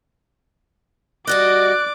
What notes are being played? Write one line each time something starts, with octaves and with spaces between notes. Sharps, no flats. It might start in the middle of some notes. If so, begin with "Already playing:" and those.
G3 F#4 D5 D#5 D6 F#6